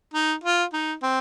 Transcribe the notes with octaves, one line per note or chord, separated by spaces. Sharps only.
D#4
F4
D#4
C4